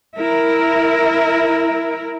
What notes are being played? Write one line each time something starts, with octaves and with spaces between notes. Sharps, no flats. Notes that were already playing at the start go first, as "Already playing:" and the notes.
E4 A#4